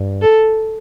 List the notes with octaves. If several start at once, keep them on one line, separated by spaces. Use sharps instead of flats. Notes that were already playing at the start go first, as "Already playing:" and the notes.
Already playing: G2
A4